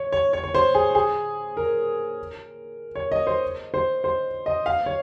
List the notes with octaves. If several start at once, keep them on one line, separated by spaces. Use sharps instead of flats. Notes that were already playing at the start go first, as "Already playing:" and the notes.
Already playing: C#5
C#5
C#5
C#5
C5
G#4
G#4
A#4
C#5
D#5
C5
C5
C5
D#5
F5
C#5